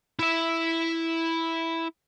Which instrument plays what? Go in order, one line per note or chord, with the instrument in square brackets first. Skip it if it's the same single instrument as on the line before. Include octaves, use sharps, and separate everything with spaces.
[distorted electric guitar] E4 E5